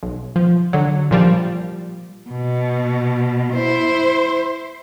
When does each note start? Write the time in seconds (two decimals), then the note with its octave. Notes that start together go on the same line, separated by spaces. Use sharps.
0.03 B1
0.36 F3
0.73 D3 F#3
1.11 A#2 F3 G3
2.30 B2
3.54 E4 C5